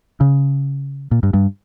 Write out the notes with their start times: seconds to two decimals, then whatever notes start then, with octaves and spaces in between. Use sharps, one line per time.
0.21 C#3
1.11 A#2
1.23 G2
1.34 G2